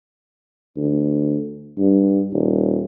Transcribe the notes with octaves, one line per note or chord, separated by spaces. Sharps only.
D2
G2
D#1